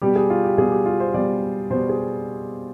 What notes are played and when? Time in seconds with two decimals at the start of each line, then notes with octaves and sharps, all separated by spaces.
0.02 B2 G3 G4
0.16 G#4
0.30 F4
0.44 G4
0.58 B2 G3 G#4
0.72 G4
0.86 F4
1.00 C5
1.14 B2 G3 D5
1.70 B2 G3 C5
1.89 G#4